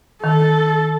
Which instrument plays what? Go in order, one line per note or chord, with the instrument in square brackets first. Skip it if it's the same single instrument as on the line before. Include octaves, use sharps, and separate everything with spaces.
[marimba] D#3 [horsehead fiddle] A4